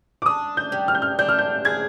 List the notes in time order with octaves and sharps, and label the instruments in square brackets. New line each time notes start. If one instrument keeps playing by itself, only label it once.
[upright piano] D6
[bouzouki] D4 [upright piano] D#6
[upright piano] G6
[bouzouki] G3
[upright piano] F6
G6
F6
[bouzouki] D4 [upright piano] G6
[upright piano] F6
G6
[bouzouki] G#4 [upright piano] G#6